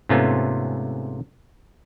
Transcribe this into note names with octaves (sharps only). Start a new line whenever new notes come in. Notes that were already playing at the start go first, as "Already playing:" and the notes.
G#2 C3 A3 B3 C#4 F4